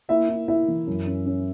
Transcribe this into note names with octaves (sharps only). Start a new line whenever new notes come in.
A#3 E4 E5
E4
E4 E5
E3
F#2
C#4
C#4